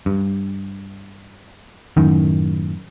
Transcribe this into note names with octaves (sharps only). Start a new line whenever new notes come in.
G2
F#2 A2 D#3